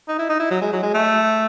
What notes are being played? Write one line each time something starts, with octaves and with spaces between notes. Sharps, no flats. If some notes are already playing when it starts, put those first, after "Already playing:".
D#4
E4
D#4
E4
F#3
G#3
F#3
G#3
A3